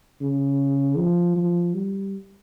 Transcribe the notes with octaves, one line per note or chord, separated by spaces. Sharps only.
C#3
F3
F3
G3